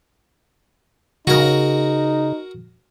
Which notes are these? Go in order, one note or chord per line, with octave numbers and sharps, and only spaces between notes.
C#3 D#4 F#4 A#4